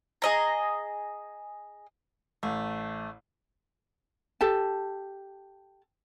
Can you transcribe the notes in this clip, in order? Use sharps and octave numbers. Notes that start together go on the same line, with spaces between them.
G#4 D#5 A#5
A1 A3
G4 A4 A5